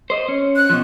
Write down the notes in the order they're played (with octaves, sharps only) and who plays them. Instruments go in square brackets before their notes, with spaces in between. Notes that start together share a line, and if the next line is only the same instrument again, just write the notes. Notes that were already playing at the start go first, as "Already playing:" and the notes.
[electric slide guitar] C5 D#5
C#4
[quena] F#6
[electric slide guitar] B2 F3